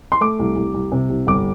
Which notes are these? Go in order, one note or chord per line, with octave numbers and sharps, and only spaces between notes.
C6
A3 D6
C2
C2
C2
C3
C2
G1 D6